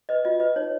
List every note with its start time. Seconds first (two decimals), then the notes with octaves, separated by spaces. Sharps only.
0.09 B4 D#5
0.25 F4 D#5
0.40 B4 D#5
0.56 D#4 C#5